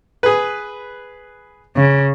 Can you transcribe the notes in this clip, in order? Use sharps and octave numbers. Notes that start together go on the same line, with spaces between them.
G#4 B4
C#3